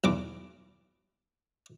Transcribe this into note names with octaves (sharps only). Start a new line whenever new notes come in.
B1 E2 D6